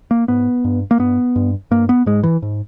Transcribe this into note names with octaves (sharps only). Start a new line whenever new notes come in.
A#3
G#2 B3
G2
A#3
G2 B3
G2
G2 A#3
B3
G#2 G#3
E3
G#2